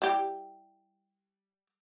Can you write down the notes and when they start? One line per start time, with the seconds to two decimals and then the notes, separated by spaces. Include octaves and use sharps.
0.02 G3 E4 G4